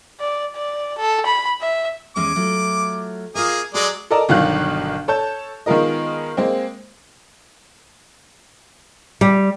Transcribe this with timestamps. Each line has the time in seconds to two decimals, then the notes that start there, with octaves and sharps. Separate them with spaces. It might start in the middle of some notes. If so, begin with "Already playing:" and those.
0.20 D5
0.56 D5
0.98 A4
1.26 B5
1.61 E5
2.16 E2 G#3 C#4 D6
2.36 F#3 A3 F4
3.35 A#3 F4 G#4 D#5
3.74 F#3 G#3 G#4 C#5 D5 A#5
4.10 A4 A#4 D5 D#5 A5 A#5
4.29 G1 B2 D#3 F#3 F5 F#6
5.08 A4 C#5 A5 G6
5.66 D#3 G#3 B3 F4 A#4 D#5
6.37 G#3 A#3 C4
9.21 G3